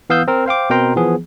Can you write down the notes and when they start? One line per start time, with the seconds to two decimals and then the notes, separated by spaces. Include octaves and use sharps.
0.10 E3 B3 F5 D#6 E6 G6
0.28 C4 A#4
0.46 C5 F5 G5 D6
0.70 B2 C4 A#4 G5 A#5 C6
0.96 E3 F3 B3 G#4